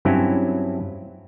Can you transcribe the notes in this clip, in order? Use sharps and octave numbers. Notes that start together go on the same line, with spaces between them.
G2 F#3 C4 C#4 E4